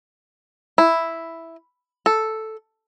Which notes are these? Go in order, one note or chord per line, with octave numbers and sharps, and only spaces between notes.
E4
A4